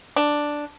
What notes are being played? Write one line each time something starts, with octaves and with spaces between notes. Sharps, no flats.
D4